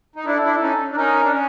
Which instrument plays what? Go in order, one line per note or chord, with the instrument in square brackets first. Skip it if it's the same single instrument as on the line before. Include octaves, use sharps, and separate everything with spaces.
[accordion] D#4
[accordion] D4 E4 [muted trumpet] A4
[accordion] D4 E4
C#4 D#4
D4
[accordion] C#4 D#4 [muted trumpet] A#4
[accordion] D4
C#4